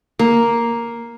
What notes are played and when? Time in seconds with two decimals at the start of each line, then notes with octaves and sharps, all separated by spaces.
0.19 A#3